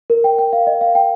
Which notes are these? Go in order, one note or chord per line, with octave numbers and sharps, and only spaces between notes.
A#4
G5
G5
F5
D#5
F5
G5